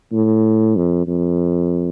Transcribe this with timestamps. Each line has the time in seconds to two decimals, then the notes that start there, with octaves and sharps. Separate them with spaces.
0.12 A2
0.76 F2
1.07 F2